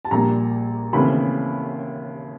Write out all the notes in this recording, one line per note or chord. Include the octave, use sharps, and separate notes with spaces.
A5
A#1 A#2 G3 A#5
D#2 C#3 E3 A3 C4 B5